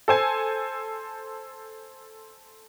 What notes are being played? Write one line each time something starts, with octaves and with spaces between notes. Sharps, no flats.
A4 C5 G#5